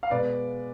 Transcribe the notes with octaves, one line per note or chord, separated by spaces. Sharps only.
F5
B2 G#3 B4 D5